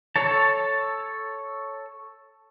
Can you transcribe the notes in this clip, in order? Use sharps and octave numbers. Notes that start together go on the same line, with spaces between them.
A4 C#5 A5